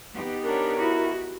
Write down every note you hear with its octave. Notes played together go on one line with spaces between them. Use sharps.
B3 D#4 G4
D4 A#4 C#5
E4 F#4